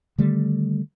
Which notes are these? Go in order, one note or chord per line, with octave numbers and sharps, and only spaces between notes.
D3 D#3 G3 A3